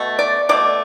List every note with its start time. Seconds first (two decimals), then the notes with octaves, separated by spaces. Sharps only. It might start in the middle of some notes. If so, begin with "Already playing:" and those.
Already playing: B2 A3
0.19 D5
0.49 B2 A3 D5